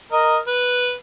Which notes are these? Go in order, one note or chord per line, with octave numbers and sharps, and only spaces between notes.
A#4 D#5
B4